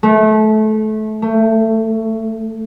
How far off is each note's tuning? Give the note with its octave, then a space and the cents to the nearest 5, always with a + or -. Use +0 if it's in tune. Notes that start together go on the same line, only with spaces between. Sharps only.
A3 -25
A3 +20